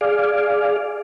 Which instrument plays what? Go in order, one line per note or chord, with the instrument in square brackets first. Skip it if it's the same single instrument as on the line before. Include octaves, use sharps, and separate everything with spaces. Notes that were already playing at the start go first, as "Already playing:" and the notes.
[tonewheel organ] G#4 D5 F5